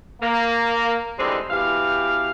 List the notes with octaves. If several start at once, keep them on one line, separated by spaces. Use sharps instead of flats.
A#3
D3 E3 G3 G#3 C4 D#4
B2 E3 G4 F5